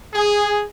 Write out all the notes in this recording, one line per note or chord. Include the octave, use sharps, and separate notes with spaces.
G#4